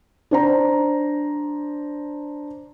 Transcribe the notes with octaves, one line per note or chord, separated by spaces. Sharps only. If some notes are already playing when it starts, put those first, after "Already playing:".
D4 C5 A#5